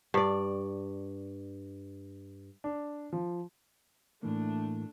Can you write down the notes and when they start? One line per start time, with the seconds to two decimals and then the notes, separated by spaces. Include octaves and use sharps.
0.14 G2 D5
2.64 D4
3.13 F3
4.23 A2 E3 A3 A#3 D4